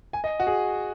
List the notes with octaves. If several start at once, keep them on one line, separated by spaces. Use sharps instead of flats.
G#5
D#5
F#4
G#4